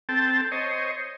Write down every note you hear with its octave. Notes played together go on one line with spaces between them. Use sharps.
C4 A4 G5 A5
C5 C#5 D#5